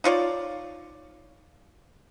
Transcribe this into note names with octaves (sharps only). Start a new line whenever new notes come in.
D#4 F4 C#5 D5